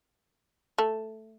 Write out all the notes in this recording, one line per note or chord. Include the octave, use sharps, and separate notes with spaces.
A3